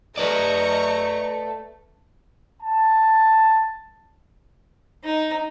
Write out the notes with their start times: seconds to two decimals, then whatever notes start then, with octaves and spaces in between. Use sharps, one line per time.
0.18 A3 B4 D5 D#5 A#5 C#6
2.63 A5
5.04 D#4